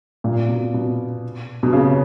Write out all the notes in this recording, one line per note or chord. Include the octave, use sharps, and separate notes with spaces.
A#2
B2
B2
B2
C#3